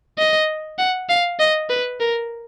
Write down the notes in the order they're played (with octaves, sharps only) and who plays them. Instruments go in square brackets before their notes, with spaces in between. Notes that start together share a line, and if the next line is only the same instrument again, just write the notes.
[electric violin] D#5
F#5
F5
D#5
B4
A#4